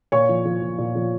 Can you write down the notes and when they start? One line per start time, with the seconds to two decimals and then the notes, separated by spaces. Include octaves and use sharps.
0.12 A#2 C#5 C#6
0.29 F3
0.45 F3
0.61 A#2
0.78 A#2
0.95 F3